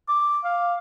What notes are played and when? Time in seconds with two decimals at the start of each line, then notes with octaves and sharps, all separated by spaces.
0.09 D6
0.45 F5